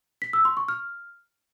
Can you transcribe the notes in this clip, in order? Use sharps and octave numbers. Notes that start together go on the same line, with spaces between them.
B6
E6
C6
C#6
F6